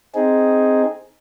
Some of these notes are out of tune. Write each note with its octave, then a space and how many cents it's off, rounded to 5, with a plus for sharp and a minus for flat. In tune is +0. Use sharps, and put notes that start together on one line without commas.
C4 +0 D#4 +0 G#4 +0